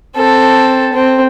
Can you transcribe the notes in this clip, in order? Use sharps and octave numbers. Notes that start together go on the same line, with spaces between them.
C4 A4
C4